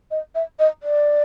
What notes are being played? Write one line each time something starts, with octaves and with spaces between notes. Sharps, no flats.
D#5
E5
D#5
D5